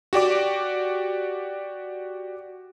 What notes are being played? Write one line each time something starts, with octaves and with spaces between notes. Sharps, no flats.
F#4 G4 D5 D6